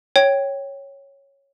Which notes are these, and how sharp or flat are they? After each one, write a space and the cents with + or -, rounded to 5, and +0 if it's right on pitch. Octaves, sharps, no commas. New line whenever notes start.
C#5 -5 G5 +0